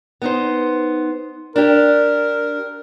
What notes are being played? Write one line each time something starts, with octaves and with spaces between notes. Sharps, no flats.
B3 D#4 C5
D4 G4 A#4